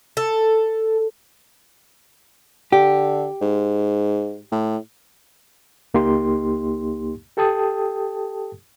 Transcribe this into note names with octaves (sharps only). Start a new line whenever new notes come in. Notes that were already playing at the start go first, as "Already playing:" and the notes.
A4
D3 G4
G#2
A2
C#2 A#3 D#4 G4 C6
G4 A4 G5 A5 D#6